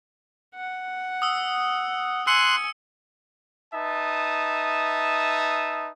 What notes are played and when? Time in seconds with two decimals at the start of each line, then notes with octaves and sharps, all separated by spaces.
0.55 F#5
1.22 D#6 E6
2.27 G#5 C6 E6 F#6 C#7
3.74 D#4 B4 E5 A5 D#6